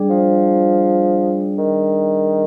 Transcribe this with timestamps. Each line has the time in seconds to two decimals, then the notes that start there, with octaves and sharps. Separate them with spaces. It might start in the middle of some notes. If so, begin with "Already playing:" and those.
Already playing: G3 D4 G#4 D5
0.10 F3
1.58 D#3